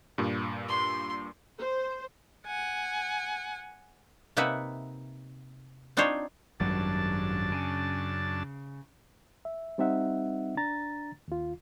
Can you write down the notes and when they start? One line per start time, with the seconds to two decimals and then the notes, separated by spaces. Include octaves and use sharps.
0.18 G2 A#2
0.68 C6
1.59 C5
2.46 F#5 G#5
4.37 C3 A#3 D#4 B4 E5 F#5
5.97 C4 D4 D#4 F4 C5 C#5
6.60 G#1 F#2 F#3 G3 D4 A5
7.52 C#3
9.45 E5
9.78 G3 C4 D#4 E5 F#5
10.57 D4 A#5 A6
11.28 D#2 F4